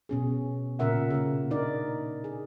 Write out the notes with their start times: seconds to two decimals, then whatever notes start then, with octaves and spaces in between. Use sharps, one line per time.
0.09 B2 C#4 G#4
0.79 A#2 C#3 C#4 A#4 E5 F#5
1.10 C#3 A#3
1.51 D4 D#4 A#4 D5
2.24 G#4